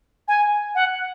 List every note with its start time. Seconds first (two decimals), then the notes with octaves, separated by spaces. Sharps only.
0.28 G#5
0.75 F#5